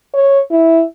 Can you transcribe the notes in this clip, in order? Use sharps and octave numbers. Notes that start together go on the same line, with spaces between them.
C#5
E4